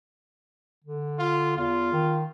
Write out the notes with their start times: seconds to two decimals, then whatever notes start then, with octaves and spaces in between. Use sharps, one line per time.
0.85 D3
1.19 F4
1.57 E2 F4
1.92 D#3